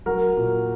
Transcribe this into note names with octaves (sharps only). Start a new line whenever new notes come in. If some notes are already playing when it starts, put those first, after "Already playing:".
F#3 A#4
A#2